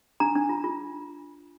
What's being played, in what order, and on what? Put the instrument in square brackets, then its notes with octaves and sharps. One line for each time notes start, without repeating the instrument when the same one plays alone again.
[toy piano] D4 A#5
D4
F4
F4